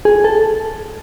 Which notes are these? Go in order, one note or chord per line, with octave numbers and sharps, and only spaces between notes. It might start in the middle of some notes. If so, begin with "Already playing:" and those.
G#4
A4